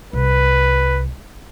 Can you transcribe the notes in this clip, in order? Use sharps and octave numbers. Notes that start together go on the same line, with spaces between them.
C2 B4